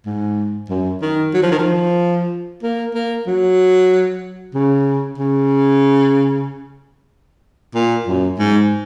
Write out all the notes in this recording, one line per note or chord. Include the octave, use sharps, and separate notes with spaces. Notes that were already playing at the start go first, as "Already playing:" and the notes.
G#2
F#2
D#3
F#3
F3
D#3
F3
A#3
A#3
F#3
C#3
C#3
A#2
F#2
G#2